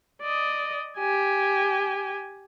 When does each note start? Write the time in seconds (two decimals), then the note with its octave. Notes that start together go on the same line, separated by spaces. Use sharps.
0.22 D5 D#5
0.98 G4 G#5